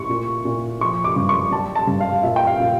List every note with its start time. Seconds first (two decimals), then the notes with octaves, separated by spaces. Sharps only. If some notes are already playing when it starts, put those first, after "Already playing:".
Already playing: A2 C#6
0.10 A#2
0.45 A#2
0.81 F3 C#6
1.04 D6
1.16 G2
1.29 C#6
1.52 G3 A5
1.75 A5
1.87 G2
2.01 F5
2.23 A#2 E5
2.36 G5
2.47 F5
2.60 A#2